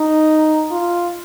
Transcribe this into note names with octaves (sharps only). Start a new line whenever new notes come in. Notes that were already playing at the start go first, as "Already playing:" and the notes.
Already playing: D#4
F4